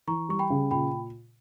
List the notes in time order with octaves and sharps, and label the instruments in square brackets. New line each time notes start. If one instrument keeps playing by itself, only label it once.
[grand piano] E3 [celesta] A#5 C#6
[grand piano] G3 [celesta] C#6
[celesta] G5 B5
[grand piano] C#3
[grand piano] A#2 [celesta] G5 B5